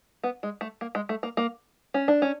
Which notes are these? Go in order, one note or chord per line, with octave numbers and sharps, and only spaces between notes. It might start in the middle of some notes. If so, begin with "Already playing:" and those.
B3
G#3
A3
A#3
G#3
A3
A#3
A#3
C#4
D4
C#4